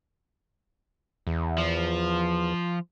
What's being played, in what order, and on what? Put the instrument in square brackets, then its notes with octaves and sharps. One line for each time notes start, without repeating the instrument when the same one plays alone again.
[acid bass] E2
[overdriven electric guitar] F3